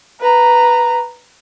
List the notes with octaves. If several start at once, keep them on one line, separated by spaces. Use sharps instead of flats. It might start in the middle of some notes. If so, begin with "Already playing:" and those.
B4 A#5